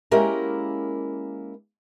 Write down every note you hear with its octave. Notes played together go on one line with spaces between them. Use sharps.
G#3 A#3 C#4 E4 G4 A#4